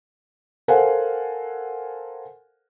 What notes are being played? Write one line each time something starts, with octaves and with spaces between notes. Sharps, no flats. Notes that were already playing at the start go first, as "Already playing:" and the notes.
A4 A#4 C5 F5 F#5 G#5